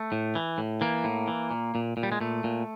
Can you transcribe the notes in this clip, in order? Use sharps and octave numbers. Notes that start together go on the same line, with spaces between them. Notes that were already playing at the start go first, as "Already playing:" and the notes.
Already playing: A3
A2
E3
A2
E3 A#3
A2
E3
A#2
A#2
A#2
G3
G#3
A#2 A3
A#2